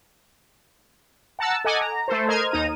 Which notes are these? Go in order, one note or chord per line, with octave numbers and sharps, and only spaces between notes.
F#5 A5 A#5 E6
A4 D#5 F#5 G#5 D6
A#5
A3 A4 C5
A#4 C5 D#5 F6 G#6
D#2 D#4 A#5 D#7